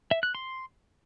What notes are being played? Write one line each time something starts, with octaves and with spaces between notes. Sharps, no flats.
E5
F#6
C6